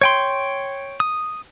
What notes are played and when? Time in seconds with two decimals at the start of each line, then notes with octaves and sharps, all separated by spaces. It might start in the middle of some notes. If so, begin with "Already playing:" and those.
0.01 C#5 G5 C6
1.00 D#6